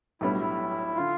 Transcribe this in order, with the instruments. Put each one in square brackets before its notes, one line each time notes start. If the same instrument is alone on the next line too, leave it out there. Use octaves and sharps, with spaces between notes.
[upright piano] B1 A2 G3 B3 D4 [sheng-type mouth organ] E4
[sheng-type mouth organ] E4
[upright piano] D3 [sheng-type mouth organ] F4